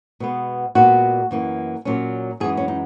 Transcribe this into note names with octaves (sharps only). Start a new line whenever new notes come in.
B2 G#3 B3
A#2 G#3 B3 F#4
F#2 E3 A#3
A#2 F#3 C#4
F#2 E3 G#3 G#4
C#4
D#4